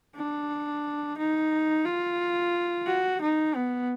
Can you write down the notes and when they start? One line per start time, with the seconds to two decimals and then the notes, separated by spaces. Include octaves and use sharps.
0.16 D4
1.18 D#4
1.85 F4
2.87 F#4
3.21 D#4
3.55 B3